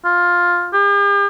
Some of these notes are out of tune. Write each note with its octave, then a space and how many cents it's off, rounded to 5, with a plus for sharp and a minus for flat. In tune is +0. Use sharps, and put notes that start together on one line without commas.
F4 +10
G4 +45